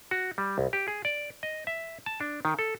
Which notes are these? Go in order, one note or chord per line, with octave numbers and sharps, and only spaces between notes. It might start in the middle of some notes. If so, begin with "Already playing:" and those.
F#4
G3
C2
G4
G#4
D5
D#5
E5
A5
D4
D#3
A4